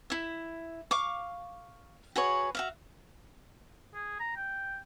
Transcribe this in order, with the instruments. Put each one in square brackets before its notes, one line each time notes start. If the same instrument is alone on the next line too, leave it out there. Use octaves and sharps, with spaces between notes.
[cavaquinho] E4 E5
F5 C#6 D6
F#4 G#4 B4 C#5
F#4 E5 F5
[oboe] G#4
A#5
G5